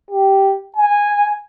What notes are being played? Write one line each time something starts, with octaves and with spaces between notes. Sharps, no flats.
G4
G#5